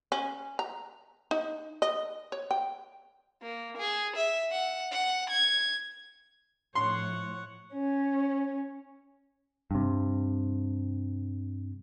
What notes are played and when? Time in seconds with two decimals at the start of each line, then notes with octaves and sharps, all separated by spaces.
0.12 C#4
0.59 A#5
1.31 D#4
1.82 D#5
2.32 C#5
2.51 G5
3.42 A#3
3.78 G#4
4.17 E5
4.51 F#5
4.92 F#5
5.30 G#6
6.75 A2 F3 C#5 F#5 C6
7.74 C#4
9.71 G2 C3